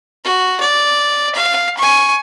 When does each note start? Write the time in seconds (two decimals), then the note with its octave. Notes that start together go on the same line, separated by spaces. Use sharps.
0.24 F#4
0.60 D5
1.35 F5
1.77 G#5 C#6